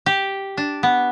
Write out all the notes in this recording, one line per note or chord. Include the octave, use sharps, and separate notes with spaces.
G4
D4
B3